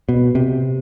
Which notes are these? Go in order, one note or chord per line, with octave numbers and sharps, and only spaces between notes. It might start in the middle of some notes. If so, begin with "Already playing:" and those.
B2
C3